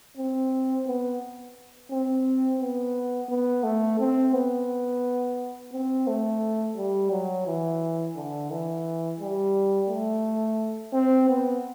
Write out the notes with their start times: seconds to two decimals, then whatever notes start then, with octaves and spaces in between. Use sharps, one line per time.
0.17 C4
0.87 B3
1.90 C4
2.60 B3
3.29 B3
3.64 A3
3.99 C4
4.33 B3
5.73 C4
6.07 A3
6.77 G3
7.11 F#3
7.47 E3
8.16 D3
8.51 E3
9.20 G3
9.89 A3
10.93 C4
11.29 B3